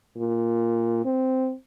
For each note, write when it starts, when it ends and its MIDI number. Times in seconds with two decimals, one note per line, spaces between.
0.17 1.01 46
1.05 1.54 60